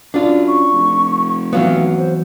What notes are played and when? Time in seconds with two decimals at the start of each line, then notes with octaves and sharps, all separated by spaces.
0.14 F#2 D4 F4 D5
0.47 C#6
0.73 F1
1.53 E3 F#3 B3 F5
1.98 C5